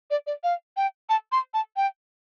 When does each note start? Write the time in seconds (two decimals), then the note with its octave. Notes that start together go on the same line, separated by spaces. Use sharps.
0.11 D5
0.27 D5
0.44 F5
0.77 G5
1.09 A5
1.32 C6
1.54 A5
1.77 G5